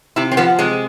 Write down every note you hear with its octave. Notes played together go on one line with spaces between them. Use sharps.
C3 E4
C4
F3 B3
C3 G#3